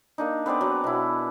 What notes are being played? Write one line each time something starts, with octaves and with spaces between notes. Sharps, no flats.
A#3 D4 D#4
B3 C4 G#4 D5
F#3
B2 E4